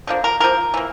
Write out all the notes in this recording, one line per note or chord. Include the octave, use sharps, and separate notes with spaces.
D3 F3 A#3
A#4
D3 F3 A#3 A#4
E3 A#3